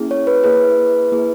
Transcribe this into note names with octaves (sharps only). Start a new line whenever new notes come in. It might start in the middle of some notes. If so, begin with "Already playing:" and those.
Already playing: A#3 C#4 E4 G#4
C#5
B4
A#3 E4 G#4 B4
A#3 E4 G#4